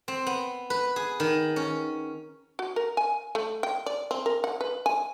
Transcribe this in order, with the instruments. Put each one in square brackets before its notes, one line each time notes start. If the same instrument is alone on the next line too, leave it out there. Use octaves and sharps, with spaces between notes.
[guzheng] C4
B3
B4
G#4
D#3
C#4
[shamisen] F#4
A#4
G#5
A3
G5
D5
C4
A#4
F#5
B4
G#5